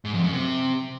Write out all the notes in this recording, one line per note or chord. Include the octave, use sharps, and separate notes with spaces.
G#2
F2
F#2
C3